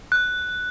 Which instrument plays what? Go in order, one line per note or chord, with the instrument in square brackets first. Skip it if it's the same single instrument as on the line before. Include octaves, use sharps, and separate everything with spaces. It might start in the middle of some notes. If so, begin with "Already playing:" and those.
[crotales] F#6